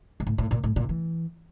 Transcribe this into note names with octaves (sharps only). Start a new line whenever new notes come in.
G#2
A2
A2
A#2
A2
A#2
E3